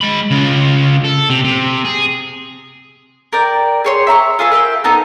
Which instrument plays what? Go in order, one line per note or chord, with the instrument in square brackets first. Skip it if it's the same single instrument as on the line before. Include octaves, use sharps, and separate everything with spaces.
[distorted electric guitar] G#3 B5
C#3 F4
A4
C3
C3
G#4
[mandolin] A#4 D5 G5
G#4 C#5 C6
E5 A#5 B5 C#6
F4 G#4 A4 B4
A#4 E5 F5 G5
B3 D#4 A4